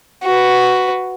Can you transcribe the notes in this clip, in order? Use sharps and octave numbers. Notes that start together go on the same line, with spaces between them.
F#4 B4